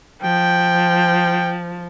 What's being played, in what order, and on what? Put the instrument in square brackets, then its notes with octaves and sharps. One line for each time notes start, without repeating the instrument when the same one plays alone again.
[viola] F3 [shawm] G5